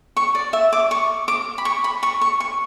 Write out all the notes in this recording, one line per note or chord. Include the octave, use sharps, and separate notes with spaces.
C#6
D5
E5
D6
C#6
D6
B5
C#6
B5
C#6
C#6
C#6